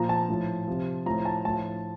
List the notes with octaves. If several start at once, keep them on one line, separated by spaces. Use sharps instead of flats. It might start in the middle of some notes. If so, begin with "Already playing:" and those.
Already playing: A#2 F3 A#5
A5
A2 F3
C3 F3
A2 F3 A#5
A5
A2 F3 A5